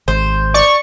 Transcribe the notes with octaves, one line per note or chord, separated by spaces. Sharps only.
G#1 C5
D5 C#6